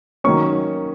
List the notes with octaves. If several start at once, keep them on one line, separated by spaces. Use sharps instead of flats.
D#3 F#3 A#3 C#4 C#6